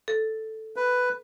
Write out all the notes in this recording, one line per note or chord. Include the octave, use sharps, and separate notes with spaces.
A4
B4